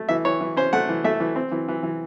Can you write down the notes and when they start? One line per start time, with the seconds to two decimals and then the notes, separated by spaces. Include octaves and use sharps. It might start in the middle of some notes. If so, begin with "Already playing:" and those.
Already playing: A3
0.09 E3 E5
0.25 E3 C#5
0.41 E3
0.57 C#4 C5
0.73 A3 F#5
0.89 E3
1.04 A3 E5
1.20 E3
1.36 C4
1.52 E3
1.68 E3
1.83 E3